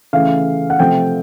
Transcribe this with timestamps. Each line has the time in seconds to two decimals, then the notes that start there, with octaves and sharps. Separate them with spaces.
0.13 C#3 E3 A3 F5
0.70 F#5
0.79 C3 F3 A3 G5